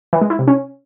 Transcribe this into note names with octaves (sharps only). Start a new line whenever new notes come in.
E3
G#3
E4
C3
C#4